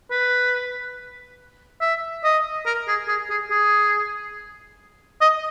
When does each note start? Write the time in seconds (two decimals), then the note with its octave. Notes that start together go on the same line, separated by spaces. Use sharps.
0.11 B4
1.81 E5
2.24 D#5
2.66 A#4
2.88 G#4
3.08 G#4
3.30 G#4
3.51 G#4
5.21 D#5